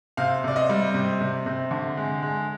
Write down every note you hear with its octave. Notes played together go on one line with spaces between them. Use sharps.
C3 F5
C3 D5
D#5
G3
C3
C3
C3
D3
G#3
G#3